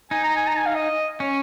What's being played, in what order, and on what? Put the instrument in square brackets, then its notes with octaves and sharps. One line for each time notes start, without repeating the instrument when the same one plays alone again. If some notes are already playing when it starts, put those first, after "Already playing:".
[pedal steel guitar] D#4 [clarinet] G#5
[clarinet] A#5
G#5
A#5
G#5
F5
D#5
[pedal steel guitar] C#4 [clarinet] C#5